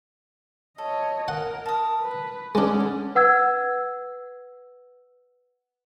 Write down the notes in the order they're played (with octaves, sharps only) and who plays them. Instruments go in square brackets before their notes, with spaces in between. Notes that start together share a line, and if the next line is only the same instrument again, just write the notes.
[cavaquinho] A4 [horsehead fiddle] C#5 D#5
[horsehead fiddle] A#4 [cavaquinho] D#5 [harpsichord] F#5
[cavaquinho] A5 D#6
[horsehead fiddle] B4
[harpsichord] G#3 D4 [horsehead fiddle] C#4 F#5 [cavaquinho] D5 D#5
[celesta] B4 F#5 E6 G#6